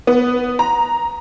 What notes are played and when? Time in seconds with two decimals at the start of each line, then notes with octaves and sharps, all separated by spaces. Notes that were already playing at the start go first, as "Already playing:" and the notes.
0.07 B3
0.59 A#5